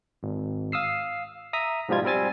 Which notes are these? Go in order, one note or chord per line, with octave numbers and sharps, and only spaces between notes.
G#1
F5 D#6 E6 C7
E5 A#5 D#6 B6
G#2 B2 F3 G3 F4 G#6
G3 C4 G#5 A6